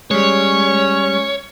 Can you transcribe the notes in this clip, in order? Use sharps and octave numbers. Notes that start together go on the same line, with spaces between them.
G3 G#3 C#4 C#5